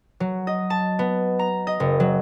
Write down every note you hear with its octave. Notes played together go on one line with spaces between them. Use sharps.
F#3
D#5
A5
B3
A#5
D#5
F#1
F#3